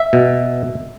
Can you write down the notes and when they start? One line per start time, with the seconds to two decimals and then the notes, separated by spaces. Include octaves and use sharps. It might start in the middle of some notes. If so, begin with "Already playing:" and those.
Already playing: E5
0.13 B2